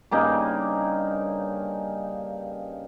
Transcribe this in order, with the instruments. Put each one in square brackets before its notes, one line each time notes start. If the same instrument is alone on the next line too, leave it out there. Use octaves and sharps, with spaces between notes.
[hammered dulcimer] G2 C#3 A#3 D#4